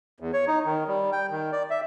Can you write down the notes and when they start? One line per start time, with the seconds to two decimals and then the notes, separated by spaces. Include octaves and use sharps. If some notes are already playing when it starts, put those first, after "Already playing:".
0.20 E2
0.33 C#5
0.47 D#4
0.66 D#3
0.87 G3
1.12 G5
1.31 D#3
1.52 D5
1.70 E5